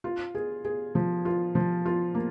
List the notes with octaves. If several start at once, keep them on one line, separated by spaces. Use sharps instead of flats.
F4
G#4
G#4
F3
F4
F3
F4
A#3